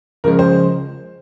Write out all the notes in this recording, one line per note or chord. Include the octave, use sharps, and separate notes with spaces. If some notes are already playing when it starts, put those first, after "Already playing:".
C#3 F3 G#3 A#4
C5